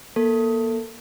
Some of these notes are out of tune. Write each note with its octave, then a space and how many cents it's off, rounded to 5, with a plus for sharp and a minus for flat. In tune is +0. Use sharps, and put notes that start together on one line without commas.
A#3 +30 A4 +20